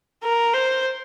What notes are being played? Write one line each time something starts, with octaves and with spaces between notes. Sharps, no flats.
A#4
C5